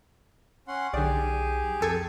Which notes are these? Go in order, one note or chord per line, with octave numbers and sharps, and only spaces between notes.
C#4 F#5 C6
B1 D3 G4 G#4 D5
F2 A4 G#6